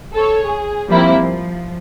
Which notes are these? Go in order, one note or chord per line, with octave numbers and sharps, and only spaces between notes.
A4 C#5
G#4
F3 G3 A#3 C4 E4
F3